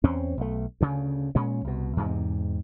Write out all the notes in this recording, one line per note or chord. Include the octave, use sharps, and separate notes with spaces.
E2 C4 C#4
B1 A3
D2 C#3
A#2 G#3 C#4
C2 B2
E2 G#2 C3